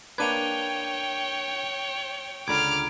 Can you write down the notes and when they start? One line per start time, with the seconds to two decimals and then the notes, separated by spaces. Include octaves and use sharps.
0.18 A#3 D4 B4 C#5 G5 G#6 D#7 F7
2.48 C#2 D3 A#5 B5 D6 F6 G#6